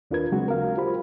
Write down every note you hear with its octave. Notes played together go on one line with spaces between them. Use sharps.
D#2 D4 F4 A#4 B4 G#6
C#3 F#3 G#3 C4 D4 F#4
A#4 F5
F4 G4 C5 B5